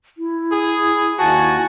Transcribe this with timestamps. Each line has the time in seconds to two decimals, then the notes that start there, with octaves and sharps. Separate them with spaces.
0.18 E4
0.52 G#4
1.19 D#2 F#4 G#5 A5